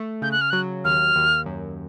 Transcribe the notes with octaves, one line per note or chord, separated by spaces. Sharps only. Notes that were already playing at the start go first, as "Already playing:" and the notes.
Already playing: A3
C#3 G6
F#6
F6
F#3 F#6
D#2 F6
D#2
F#2